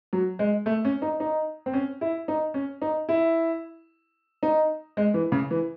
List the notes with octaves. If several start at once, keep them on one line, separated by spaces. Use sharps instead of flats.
F#3
G#3
A3
C#4
D#4
D#4
C4
C#4
E4
D#4
C#4
D#4
E4
D#4
G#3
E3
C#3
E3